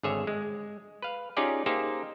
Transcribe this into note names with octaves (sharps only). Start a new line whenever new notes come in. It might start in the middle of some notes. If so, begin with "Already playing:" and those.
G#1 D3 G#4 C#5 E5
G#3
B4 F5
C#4 D#4 F4 G4 G#4 D5
A#3 D#4 G4 G#4 C5 E5